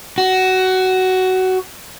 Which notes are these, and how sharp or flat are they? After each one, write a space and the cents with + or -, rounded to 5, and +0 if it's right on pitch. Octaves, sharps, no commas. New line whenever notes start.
F#4 +15